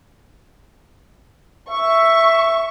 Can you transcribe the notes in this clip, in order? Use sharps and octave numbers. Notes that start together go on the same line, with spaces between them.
E5 C#6